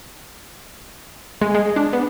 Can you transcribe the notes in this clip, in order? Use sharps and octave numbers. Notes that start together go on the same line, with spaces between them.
G#3
G#3
D4
B3